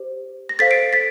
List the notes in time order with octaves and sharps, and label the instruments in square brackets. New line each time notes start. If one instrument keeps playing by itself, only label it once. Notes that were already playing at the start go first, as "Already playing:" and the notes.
Already playing: [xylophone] G4 C5
A#6
A4 C5 F5 A6 B6
C7 D7
A6 B6